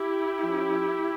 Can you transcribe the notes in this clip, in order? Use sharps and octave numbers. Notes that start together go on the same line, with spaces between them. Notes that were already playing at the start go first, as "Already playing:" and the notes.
Already playing: E4 G4
F3 C#4